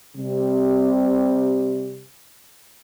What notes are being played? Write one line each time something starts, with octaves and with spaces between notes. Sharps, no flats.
C3 G3